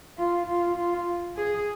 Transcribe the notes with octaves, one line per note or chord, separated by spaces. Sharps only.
F4
F4
F4
G#4